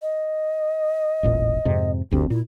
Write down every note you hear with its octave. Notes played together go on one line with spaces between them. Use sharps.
D#5
E1 A1 A#2
F2 G#2 C3
F#1 D2 C4 G4
A#2 E4